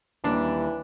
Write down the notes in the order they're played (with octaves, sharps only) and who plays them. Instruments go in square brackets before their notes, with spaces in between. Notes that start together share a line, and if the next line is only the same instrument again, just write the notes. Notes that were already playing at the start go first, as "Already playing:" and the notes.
[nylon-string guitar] D#2 G3 [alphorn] E3 [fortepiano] D4